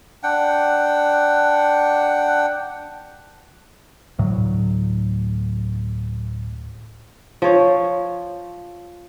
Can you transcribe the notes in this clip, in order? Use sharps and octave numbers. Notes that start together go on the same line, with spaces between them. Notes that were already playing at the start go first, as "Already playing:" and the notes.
D4 F#5 G5
D2 A2 F#3
F3 C#5